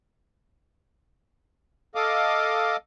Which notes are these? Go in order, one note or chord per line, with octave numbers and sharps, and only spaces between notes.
A4 D#5 F5 D6